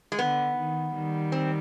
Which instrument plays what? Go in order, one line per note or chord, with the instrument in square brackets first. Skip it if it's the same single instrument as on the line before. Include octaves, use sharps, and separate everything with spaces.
[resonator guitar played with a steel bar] G#3
[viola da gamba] D3 [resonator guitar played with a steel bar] B3
[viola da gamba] D#3
D#3 G3
[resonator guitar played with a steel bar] C4